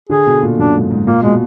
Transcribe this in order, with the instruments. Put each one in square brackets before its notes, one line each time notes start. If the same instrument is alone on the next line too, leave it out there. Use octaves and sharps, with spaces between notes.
[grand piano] D3 [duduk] G#4
[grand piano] B2
A#2
[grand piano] F#2 [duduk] D4
[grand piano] G#2
G#2
[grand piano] A#2 [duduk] A#3
[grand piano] B2 [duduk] G#3